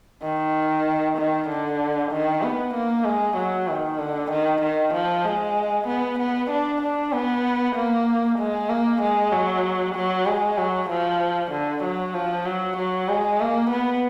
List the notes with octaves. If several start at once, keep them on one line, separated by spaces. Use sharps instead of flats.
D#3
D#3
D3
D#3
B3
A#3
G#3
F#3
D#3
D3
D#3
D#3
F3
G#3
B3
B3
D4
D4
B3
A#3
G#3
A#3
G#3
F#3
F#3
G#3
F#3
F3
D3
F#3
F3
F#3
F#3
G#3
A#3
B3